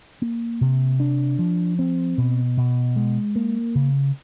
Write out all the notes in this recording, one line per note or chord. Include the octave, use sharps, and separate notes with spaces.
A#3
C3
D4
F3
C4
B2
B2
G#3
A#3
C#3